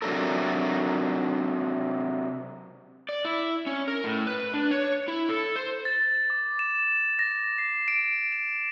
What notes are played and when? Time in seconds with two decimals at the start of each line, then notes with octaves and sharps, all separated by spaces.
0.02 C3 F#3 C4 D4 A4 A#4
3.09 D5
3.25 E4
3.67 C#4
3.88 A#4
4.04 A2
4.27 B4
4.54 D4
4.71 C#5
5.08 E4
5.29 A4
5.56 C5
5.85 A6
6.30 D6
6.59 E7
7.19 A#6
7.58 C7
7.88 D7
8.32 E7